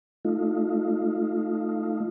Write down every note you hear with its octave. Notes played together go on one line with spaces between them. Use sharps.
A3 D#4 F4